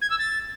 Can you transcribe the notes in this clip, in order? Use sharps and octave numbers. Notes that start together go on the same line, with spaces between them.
G#6
E6
A6